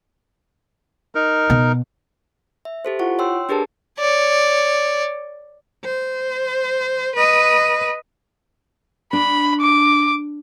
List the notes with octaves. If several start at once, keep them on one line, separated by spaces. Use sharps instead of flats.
D#4 A#4
B2
E5
G4 A4 C5
E4 F4 F#5 C#6
C#5 G5 C6 E6
D4 G4 G#4 A#4 B4 A5
C#5 D5
C5
B4 D#5
D4 B5
D6